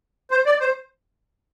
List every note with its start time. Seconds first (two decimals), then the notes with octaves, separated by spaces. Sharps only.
0.31 C5
0.46 D5
0.60 C5